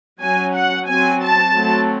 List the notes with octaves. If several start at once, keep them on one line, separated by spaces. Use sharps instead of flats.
F#3 C#4 G#5
F#5
F#3 C4 G#5
A5
F#3 A3 C4